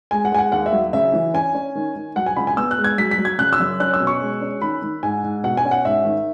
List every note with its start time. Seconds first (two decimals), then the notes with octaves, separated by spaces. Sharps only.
0.11 G#3 G#5
0.25 F#5
0.32 G#3 G#5
0.38 F#5
0.52 D#2 F#5
0.66 E5
0.73 F#3
0.93 C#3 E5
1.13 E3
1.34 C#4 G#5
1.55 C#4
1.75 D#3
1.95 D#3
2.16 F#3 F#5
2.26 G#5
2.36 C#2 B5
2.47 G#5
2.57 B3 E6
2.71 F#6
2.78 G#3
2.84 G#6
2.98 F#3 B6
3.11 B6
3.18 F#3
3.25 G#6
3.38 C#3 F#6
3.53 E6
3.60 F#2
3.80 C#4 F#6
3.94 E6
4.00 B2
4.07 C#6
4.21 G#3
4.41 C#4
4.62 D#3 B5
4.82 D#3
5.03 G#2 G#5
5.24 G#2
5.44 B2 F#5
5.57 G#5
5.65 C#4
5.71 F#5
5.85 G#2 E5
6.05 D#3